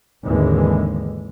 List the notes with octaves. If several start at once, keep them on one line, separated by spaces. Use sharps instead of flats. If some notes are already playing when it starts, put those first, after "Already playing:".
G#1 D#2 D3 E3 G#3